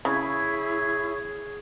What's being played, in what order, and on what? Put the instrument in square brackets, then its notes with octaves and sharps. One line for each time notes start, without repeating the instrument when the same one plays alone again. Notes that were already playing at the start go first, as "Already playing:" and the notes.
[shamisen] C#3 [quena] E4 [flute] G#4 [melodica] C#5